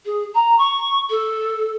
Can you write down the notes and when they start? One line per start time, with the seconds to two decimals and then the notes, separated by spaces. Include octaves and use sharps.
0.06 G#4
0.35 A#5
0.58 C#6
1.10 A4